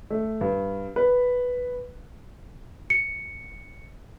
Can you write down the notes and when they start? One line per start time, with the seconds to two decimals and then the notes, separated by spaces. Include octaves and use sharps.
0.10 A3
0.41 G2
0.96 B4
2.90 C#7